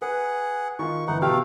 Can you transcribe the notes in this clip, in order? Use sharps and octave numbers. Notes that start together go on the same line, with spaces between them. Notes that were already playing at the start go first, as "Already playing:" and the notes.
G#4 B4 F#5
D#3 F4 C#6
G1 E3 D#4 F#5
B2 A3 G4 A4 F5 G5 F6